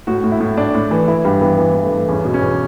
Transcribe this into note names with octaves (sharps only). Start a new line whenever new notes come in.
A2 F#4
A2
E4
A2
A2 D4
A2
E3
E3 E4
G2 G4
E3 B3
E3 B3
G2
A3
E3
E2 C#4
B2
C#4
E2